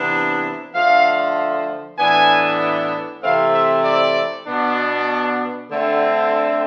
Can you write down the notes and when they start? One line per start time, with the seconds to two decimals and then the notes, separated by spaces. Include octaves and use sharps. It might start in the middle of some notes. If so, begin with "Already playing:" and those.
Already playing: C3 E3 B3 D4
0.75 D3 F3 A3 F5
1.98 A2 E3 B3 D4 G#5
3.22 C3 E3 A3 C4 F5
3.54 E5
3.85 D5
4.46 B2 B3 D4
5.70 D3 A3 C4